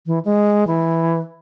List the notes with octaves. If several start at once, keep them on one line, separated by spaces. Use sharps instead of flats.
E3
G#3
E3